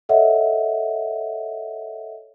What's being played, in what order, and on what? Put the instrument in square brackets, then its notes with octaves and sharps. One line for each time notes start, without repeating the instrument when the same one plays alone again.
[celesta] A4 C#5 D#5 E5 F#5